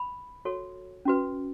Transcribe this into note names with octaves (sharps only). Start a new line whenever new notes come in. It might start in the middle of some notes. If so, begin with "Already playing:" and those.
Already playing: B5
F#4 A4 C#5
C#4 F#4 B4